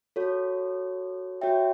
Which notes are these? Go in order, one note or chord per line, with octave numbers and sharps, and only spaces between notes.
F#4 A4 C#5
F#4 C#5 E5 G5